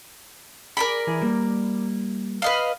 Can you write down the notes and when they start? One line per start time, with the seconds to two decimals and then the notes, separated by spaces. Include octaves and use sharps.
0.77 G#4 A#4 D5 B5
1.07 E3 E4 G#4
1.21 G3 A#3
2.42 B4 D#5 F5